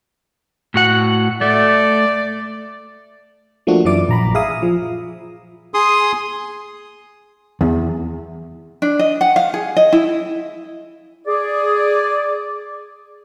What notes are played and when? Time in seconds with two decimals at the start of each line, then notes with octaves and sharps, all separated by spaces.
0.74 A2 F#4 F#5
1.41 A3 D5
3.67 F3 A3 A#3 D4 F#4
3.85 F#2 E3 E4 D5 D6
4.09 A#1 A#5 B5
4.35 G#4 E5 F5 G#5 D#6
4.63 F3
5.74 G#4 C6 D#6
7.61 E2
8.82 D4
8.99 D#5
9.21 F#5
9.36 F5
9.54 G#4
9.77 D#5
9.93 E4
11.27 G#4 D5